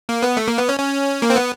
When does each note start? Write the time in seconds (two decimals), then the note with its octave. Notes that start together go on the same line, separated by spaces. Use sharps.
0.09 A#3
0.22 B3
0.37 A3
0.48 A#3
0.58 B3
0.69 C#4
0.79 C#4
1.22 A#3
1.30 C4
1.36 B3